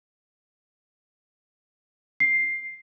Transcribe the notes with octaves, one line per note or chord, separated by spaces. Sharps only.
C7